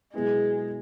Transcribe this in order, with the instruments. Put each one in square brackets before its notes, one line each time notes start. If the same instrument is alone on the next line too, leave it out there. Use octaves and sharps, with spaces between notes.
[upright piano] B2 F#3 B3 E4 [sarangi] G#3